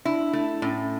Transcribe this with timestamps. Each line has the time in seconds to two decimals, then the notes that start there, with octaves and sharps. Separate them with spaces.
0.05 D4 E4
0.33 A3
0.62 A2 C#4